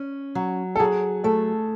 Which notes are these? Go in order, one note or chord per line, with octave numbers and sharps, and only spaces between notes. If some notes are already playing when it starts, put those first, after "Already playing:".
Already playing: C#4
F#3
A4
F#3 G#4
A3 A4